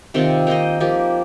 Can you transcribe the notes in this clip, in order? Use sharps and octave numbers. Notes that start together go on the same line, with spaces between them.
C3 D#3 C4 F4
A#3 D#4 C5 D#5
F3 A#3 G4